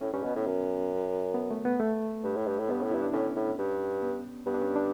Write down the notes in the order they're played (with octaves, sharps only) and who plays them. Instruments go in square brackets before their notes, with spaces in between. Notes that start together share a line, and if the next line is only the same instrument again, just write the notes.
[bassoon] A2 [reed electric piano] C#4
[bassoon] G2 [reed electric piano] C#4
[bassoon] B2 [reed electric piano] B3
[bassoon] A2
F#2
[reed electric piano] B3
A3
B3
A3
[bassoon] G2
A2
G2
A2
[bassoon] G2 [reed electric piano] B3
[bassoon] A2 [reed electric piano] C#4
[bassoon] G2 [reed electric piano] E4
[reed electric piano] D4
[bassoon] A2 [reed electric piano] C#4
[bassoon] A2
G2
[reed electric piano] B3
[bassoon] G2 [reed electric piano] B3
[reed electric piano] D4
C#4
D4